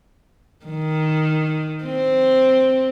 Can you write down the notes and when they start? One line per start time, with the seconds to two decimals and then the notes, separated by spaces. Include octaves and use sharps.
0.66 D#3
1.83 C4